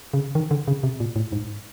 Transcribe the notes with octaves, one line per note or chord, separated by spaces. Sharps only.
C#3
D#3
D3
C#3
C3
A#2
A2
G#2